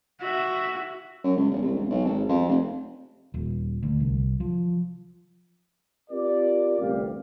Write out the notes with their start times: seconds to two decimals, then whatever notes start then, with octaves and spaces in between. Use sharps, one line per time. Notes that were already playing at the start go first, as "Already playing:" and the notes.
0.21 F#4 E5
1.24 F#2
1.36 C#2
1.51 E1
1.62 C2
1.76 E1
1.90 B1
2.04 G#1
2.29 F2
2.48 F1
3.34 D#1
3.83 D2
4.00 C2
4.40 F3
6.10 C4 F4 G4 A#4 D5
6.80 A1 D2 G2 C3 G4 F5